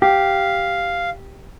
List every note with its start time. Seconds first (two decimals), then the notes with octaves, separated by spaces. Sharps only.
0.02 G4 F5